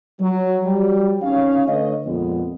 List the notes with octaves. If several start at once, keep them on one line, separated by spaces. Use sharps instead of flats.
F#3
F#3 G3
G#1 C#4 F5
D3 A3 B4 C#5 D#5
F2 A#2 G#3 B3